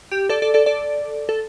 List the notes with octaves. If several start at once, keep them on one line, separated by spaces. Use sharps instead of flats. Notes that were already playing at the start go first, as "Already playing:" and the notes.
G4
A4 D5
A4 D5
A4 D5
A4 D5
A4